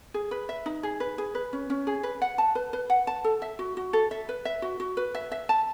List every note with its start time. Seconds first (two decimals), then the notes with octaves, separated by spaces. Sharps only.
0.14 G#4
0.31 B4
0.49 E5
0.66 D#4
0.83 G#4
1.00 B4
1.18 G#4
1.35 B4
1.53 C#4
1.70 C#4
1.87 G#4
2.03 B4
2.22 F#5
2.38 A5
2.55 B4
2.73 B4
2.90 F#5
3.07 A5
3.24 A4
3.42 E5
3.59 F#4
3.77 F#4
3.93 A4
4.11 E5
4.29 B4
4.45 E5
4.62 F#4
4.80 F#4
4.97 B4
5.15 E5
5.32 E5
5.49 A5